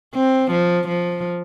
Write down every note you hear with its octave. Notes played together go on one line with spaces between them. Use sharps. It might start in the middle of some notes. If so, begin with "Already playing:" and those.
C4
F3
F3